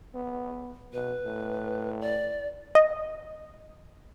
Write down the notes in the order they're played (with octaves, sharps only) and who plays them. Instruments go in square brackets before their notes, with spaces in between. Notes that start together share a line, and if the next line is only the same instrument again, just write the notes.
[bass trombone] B3
[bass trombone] B2 [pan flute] B4
[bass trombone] A2
[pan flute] D5
[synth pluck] D#5